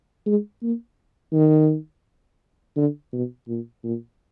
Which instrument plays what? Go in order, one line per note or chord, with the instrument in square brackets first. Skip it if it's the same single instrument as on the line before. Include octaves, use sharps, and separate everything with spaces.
[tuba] G#3
A#3
D#3
D3
B2
A#2
A#2